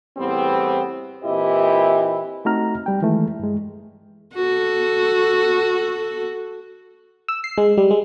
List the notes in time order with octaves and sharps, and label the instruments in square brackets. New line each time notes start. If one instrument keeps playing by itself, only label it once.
[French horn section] E2 A2 G3 B3 C4
A#2 E3 C4 E4 G4 D#5
[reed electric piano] A3 C4 D#4 F#4 A#5 F6
G3 G5
D#3 E3 G#3 A3
G2 G#3
[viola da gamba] F#4 A4
[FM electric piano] E6
C7
G#3
G3
G#3